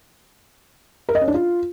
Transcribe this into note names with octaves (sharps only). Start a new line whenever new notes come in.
A#4
D#5
C#4
D4
F4